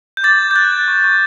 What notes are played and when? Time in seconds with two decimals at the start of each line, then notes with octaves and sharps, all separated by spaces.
0.17 G6
0.24 D6 A6
0.40 D6
0.51 G6
0.55 F#6 A6
0.72 F#6
0.88 C#6
1.04 C#6